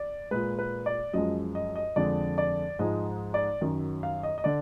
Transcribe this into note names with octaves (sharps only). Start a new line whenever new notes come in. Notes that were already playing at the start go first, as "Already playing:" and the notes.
Already playing: D5
A#2 G#3 B4
B4
D5
F#2 F3 G#3 D#5
D#5
D#5
F2 D3 G#3 D5
D5
G#2 F3 G#3 D#5
D5
F#2 D#3 F#3
F5
D#5
D#5
D3 D5